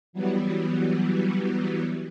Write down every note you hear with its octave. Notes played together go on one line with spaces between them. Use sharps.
E3 F#3 G3 B3